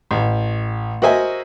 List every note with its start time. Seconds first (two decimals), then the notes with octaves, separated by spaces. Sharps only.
0.11 A1
1.02 F#4 A#4 C5 D#5 E5 G#5